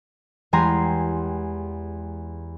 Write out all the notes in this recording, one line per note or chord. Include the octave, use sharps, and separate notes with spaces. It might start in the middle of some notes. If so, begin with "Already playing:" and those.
E2 G#3 G4 G#5 A#5 C6